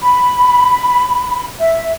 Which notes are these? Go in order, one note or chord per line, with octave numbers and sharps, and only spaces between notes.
B5
E5